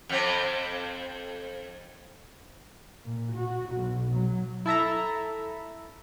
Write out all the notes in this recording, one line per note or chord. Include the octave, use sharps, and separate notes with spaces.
F2 C4
A#2
F#4
B1
F#3
E4 A4 E5 A#5